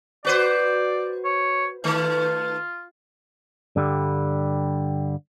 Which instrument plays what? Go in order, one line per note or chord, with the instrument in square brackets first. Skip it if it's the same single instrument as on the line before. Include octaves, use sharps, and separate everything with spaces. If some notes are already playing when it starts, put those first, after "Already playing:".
[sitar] F#4 B4 C5 [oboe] D5
[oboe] C#5
[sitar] D#3 A3 [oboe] F4
[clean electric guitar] G2 D3 G3